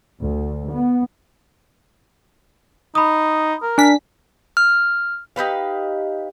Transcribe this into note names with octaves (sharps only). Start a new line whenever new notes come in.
D2
B3
D#4 B5 D#6
A#4
D4 G#5 B6
F6
D#4 G4 B4 F5